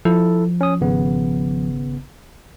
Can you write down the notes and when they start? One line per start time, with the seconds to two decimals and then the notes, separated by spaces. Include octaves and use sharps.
0.05 F3 E4 A4
0.61 C#4 D#6
0.81 G#1 C#3 B3